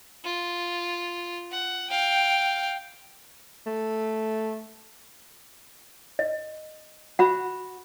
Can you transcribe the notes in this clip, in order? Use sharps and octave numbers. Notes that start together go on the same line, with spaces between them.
F4
F#5
F5 G5
A3
D#5
F#4 F#5 B5